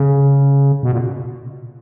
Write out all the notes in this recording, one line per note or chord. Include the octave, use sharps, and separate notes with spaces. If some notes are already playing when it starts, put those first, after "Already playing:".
Already playing: C#3
B2
A#2